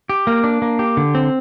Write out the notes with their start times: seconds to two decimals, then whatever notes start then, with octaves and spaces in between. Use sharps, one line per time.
0.09 G4
0.27 A#3
0.44 D4
0.62 A#3
0.79 G4
0.97 D3
1.15 C4